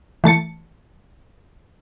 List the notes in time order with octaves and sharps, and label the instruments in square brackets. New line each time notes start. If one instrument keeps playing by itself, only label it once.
[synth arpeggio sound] E3 A3 A5 C#7